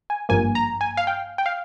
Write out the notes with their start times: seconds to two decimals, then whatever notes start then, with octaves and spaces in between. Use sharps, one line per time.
0.10 G#5
0.29 G#1 G2 F3 A#3 G#5
0.55 A#5
0.81 G#5
0.97 F5
1.07 G5
1.38 G5
1.46 F5